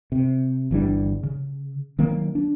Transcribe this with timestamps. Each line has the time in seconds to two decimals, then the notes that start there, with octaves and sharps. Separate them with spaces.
0.12 C3
0.71 G1 E3 G3 D4
1.23 C#3
1.99 D#3 F#3 A#3
2.35 D4